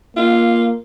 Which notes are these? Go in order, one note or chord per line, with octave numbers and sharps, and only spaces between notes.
A#3 F4